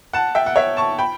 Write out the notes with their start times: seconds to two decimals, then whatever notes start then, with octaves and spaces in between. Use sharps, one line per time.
0.13 F#5 A5
0.35 E5 G5
0.46 F#5
0.56 C#5 E5
0.77 A5 C#6
0.98 G5 B5